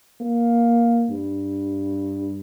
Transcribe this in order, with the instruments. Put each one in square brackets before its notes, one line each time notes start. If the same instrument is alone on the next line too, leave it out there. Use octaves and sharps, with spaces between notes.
[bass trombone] A#3
G2